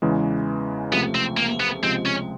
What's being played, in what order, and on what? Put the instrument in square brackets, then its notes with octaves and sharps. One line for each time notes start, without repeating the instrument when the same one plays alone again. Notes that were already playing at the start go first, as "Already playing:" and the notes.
[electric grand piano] E2 C#3 E3 G#3
[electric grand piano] C#2 C3 F3 A3 [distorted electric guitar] B3
[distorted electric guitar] C4
A#3
B3
[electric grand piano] C#2 C3 F3 G#3 [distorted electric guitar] C4
[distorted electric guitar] C#4